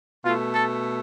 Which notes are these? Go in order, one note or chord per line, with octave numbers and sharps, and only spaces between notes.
B2 A3 F4
A4